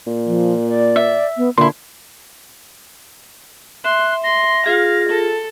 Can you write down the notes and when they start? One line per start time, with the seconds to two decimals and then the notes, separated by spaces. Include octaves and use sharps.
0.07 A#2
0.26 F3
0.68 D5
0.96 E5
1.37 B3
1.57 A#2 D3 E4 C6
3.85 E5 C6 F#6
4.24 C6 A#6
4.66 F4 G#4 F5
5.09 A4